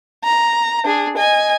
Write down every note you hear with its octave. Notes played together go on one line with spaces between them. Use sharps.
A#5
D4 G#4
D#5 G#5